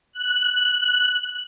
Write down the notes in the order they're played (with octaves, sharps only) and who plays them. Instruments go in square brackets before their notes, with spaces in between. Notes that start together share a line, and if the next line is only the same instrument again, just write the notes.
[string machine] F#6